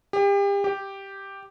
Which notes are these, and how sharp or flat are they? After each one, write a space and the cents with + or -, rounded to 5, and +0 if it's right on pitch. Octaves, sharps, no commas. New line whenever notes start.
G4 +35
G4 +0